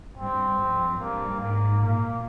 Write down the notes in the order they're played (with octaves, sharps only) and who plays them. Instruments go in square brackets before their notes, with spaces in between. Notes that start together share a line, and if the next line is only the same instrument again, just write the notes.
[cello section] G2 [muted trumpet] C4
[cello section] F2
[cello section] G2 [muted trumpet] A#3
[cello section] G#2 [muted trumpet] A#3
[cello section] A#2 [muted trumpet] A#3